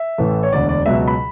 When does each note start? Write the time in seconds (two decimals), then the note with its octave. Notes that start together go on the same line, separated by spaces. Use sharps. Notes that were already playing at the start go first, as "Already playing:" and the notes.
Already playing: E5
0.18 A1 A2 E3 A3
0.43 C#5
0.52 E1 D2 D3 D5
0.69 D5
0.86 C#2 B2 F#3 E5
1.08 B5